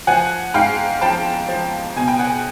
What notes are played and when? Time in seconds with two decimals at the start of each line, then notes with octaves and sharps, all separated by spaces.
0.07 F3 F#5 G#5
0.54 G#2 F5 G5
1.01 F3 G5 A5
1.48 F3
1.96 B2 G#5
2.08 G5
2.19 F#5 G#5